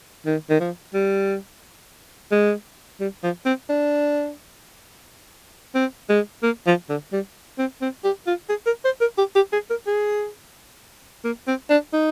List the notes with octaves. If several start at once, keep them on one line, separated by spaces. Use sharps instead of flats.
D#3
D#3
F3
G3
G#3
G3
F3
C4
D4
C4
G#3
A#3
F3
D3
G3
C4
C4
G4
F4
G#4
A#4
C5
A#4
G4
G4
G#4
A#4
G#4
A#3
C4
D4
D#4